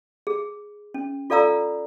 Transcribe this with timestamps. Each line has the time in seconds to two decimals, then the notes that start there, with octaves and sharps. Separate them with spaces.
0.27 G#4
0.94 C#4
1.30 F4 A4 D5 F5 A#5 E6